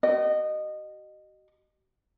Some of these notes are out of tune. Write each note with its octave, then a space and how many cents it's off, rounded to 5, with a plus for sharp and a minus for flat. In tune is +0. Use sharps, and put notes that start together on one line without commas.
F#4 +45 D#5 -20